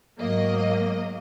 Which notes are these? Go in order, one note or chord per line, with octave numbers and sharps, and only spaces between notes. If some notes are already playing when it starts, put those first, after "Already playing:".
G#2 F#3 A#3 D#5